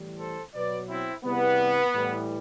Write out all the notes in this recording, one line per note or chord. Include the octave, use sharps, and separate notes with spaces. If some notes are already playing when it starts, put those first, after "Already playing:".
Already playing: A2 E3 G3
A4 C5
B2 F#3 B4 D5
C4 E4
E2 C3 E3 G3 B3
A2 E3 G3